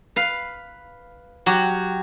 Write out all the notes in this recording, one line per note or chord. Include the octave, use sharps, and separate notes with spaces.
B4 F5
F#3 F#4 G4